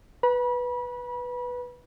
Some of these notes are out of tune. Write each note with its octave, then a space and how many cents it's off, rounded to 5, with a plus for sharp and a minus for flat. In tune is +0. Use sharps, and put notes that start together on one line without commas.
B4 +0 B5 -35